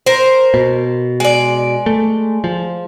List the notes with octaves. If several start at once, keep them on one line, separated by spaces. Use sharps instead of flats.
A#4 C5
B2
G#3 D5
A3
F3